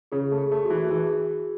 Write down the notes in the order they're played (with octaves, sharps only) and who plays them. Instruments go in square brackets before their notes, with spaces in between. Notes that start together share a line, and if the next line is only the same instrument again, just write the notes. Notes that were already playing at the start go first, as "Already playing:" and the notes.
[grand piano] C#3 [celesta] G#4
[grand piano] A3
[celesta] G#4
[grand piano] A3
[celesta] F#4
[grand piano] E3
[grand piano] E3 [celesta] G#4